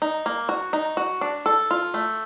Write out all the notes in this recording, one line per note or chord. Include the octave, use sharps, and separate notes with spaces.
D#4
A#3
F#4
D#4
F#4
D4
A4
F4
A3